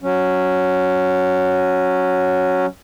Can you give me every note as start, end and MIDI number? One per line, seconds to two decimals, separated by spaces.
0.02 2.66 54
0.02 2.66 61